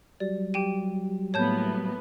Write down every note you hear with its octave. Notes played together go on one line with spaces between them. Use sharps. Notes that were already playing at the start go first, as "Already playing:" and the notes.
F#3 G3 D5
G4 G5 D#7
A2 A#3 B3 C#5 A5 G6